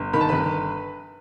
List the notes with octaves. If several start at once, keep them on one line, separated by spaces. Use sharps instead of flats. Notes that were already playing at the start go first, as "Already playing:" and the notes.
Already playing: G1
D#3 B5
A5
G1 B4 B5